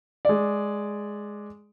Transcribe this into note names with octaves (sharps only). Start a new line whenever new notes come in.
G#3 D5